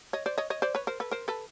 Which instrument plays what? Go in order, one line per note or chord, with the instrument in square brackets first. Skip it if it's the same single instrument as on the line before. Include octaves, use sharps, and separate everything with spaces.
[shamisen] C#5 D#5
C5 D5
C#5 D#5
C#5 D#5
C5 D5
B4 C#5
A#4 C5
A4 B4
A#4 C5
A4 B4